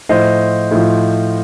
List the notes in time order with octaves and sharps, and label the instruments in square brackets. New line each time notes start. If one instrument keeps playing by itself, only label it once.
[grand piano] A2 F3 C5 D#5
A2 F3